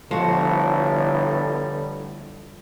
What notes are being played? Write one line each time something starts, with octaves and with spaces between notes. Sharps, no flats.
G1 A2 D3 F3 G3 F#4